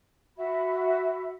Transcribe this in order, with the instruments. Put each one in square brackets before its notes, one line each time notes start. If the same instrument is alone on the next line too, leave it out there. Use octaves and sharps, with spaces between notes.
[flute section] F#4 E5 B5